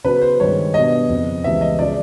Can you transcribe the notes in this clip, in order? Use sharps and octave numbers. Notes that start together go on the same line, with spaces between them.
C#3 F#3 B3 B4
C5
G2 D#3 G#3 C#5
B2 G3 B3 D4 D#5
F2 C#3 F3
C#2 C#3 E3 G3 B3 E5
D#5
C#3 F3 G#3 D5